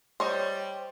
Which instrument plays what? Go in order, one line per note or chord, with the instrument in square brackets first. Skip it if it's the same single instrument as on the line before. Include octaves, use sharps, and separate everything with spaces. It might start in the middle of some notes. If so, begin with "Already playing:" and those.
[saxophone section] G3 [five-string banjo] C5 C#5 D#5